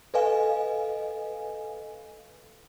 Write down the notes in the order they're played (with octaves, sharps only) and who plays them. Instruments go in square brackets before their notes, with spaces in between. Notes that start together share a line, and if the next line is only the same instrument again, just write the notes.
[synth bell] A4 B4 D#5 F5 G#5